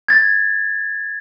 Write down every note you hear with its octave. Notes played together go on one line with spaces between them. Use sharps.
G#6 A6